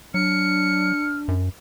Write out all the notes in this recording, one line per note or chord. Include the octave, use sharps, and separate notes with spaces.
F#3 D4 F6 C#7
F#2